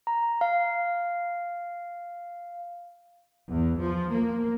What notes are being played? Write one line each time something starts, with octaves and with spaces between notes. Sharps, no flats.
A#5
F5
E2
F3
A#3